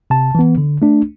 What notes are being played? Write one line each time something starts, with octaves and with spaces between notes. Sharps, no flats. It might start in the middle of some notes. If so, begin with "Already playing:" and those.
C3 A5
E3 B3
D3
A3 D4